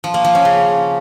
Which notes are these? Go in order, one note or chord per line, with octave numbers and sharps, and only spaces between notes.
F3
A#3
F3
C#4
C#3